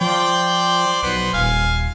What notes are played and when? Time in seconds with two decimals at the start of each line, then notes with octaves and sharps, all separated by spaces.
0.01 F3 C5 D5 G5
1.03 B1 B3 C5
1.34 D#1 F5 G#5